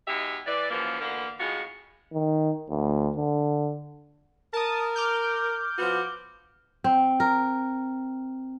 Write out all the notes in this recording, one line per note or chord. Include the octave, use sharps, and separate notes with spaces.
B2 G#3 D#4 G4 E5
E3 D5
F#2 C#3 E3 F3 A#3
B2 D3 E3 A#3
A2 C#3 G#3 F4 F#4
D#3
D2
D3
A#4 A5 D#6
D6 F6 G6
F3 B3 F#4
C4
A#4